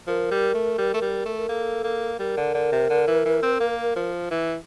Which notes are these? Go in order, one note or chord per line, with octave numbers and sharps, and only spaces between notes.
F3 A#4
G3
A3
G3
A3
G3
A3
A#4
A#3 A4
A#3
G3 A#4
D3
D3
C3
D3
E3
E3
C4
A#3
F3
E3